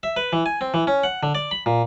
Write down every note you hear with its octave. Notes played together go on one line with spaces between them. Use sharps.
E5
B4
E3
G#5
C4
E3
C#4
F#5
D3
D5
B5
A#2